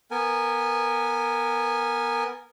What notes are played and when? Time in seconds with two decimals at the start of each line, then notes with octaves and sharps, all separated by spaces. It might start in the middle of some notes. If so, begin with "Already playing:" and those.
0.11 B3 A#4 G#5